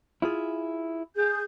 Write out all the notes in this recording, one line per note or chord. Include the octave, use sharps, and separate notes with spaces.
E4 F4 G#4
G#4 G6